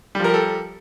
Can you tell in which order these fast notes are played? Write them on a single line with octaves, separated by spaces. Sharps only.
G3 F3 A#4 G4 A4